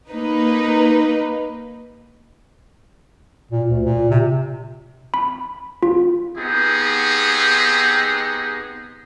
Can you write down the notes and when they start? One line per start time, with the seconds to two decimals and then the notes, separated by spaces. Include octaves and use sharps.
0.11 A#3 D#4 B4
3.51 A#2
3.70 D2
3.85 A#2
4.10 C3
5.14 B5
5.83 F4
6.37 B3 C4 D#4 G4 G#4